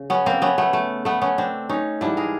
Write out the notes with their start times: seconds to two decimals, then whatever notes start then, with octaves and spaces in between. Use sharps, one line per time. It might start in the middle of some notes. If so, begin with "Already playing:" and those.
Already playing: C#3
0.10 B3 C#4
0.26 A#3 C4
0.42 B3 C#4
0.58 A3 B3
0.73 A3
1.05 A3 B3
1.22 B3 C#4
1.38 C4 D4
1.69 C#4 D#4
2.01 G#2 E3 G3 D4 E4
2.17 G#4 A#4